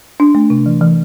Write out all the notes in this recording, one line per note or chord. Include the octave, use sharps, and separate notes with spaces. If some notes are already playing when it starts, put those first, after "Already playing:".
D4
A3
C3
E3
E3